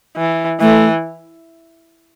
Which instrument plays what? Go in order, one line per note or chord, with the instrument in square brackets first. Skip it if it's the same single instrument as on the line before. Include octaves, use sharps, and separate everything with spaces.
[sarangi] E3
[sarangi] E3 [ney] A3